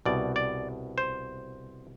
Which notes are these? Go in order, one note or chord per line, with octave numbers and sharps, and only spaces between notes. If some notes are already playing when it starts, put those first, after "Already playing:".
C2 B2 D5
D5
C5